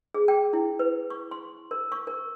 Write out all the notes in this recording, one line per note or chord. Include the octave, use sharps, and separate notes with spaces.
G#4
G5
E4
B4
C#6
C6
A#4
C#6
A#4